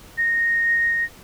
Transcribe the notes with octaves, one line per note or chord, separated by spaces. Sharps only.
A#6